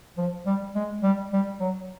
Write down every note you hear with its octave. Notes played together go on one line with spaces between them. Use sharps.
F3
G3
G#3
G3
G3
F#3